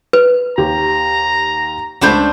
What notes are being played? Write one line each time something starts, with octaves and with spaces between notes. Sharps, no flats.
B4
D#2 G4 A#5
C#2 A3 D4 C5 B5 G6